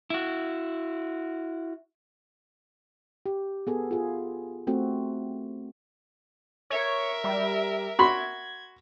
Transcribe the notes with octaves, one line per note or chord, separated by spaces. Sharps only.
E4 F#4
G4
B3 G#4 A4
F4 G#4
A3 C4 F#4
A#4 C#5 E5
G3
F#4 B5 C6 G#6